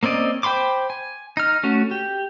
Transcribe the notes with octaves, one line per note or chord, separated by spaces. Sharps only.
A#3 C4 C#4 D5 D#5
C5 G5 B5 C6 D6
G#5
D#4 F6
A3 C#4 F#4
G4